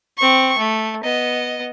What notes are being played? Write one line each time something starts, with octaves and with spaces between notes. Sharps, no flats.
C4 C#6
A3
B3 D#5